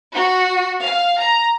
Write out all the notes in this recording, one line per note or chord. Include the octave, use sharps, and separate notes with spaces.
F#4
F5
A#5